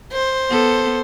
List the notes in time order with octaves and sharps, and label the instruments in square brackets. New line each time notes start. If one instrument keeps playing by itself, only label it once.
[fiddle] C5
[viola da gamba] B3 A4